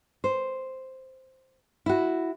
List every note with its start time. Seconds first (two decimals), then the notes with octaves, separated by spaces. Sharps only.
0.24 C5
1.86 E4 F#4